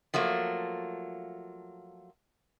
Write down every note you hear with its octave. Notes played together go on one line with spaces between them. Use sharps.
F3 F#3 A3 A#3